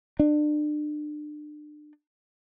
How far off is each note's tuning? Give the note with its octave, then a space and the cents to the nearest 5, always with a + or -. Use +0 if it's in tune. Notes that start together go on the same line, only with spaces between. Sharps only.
D4 +35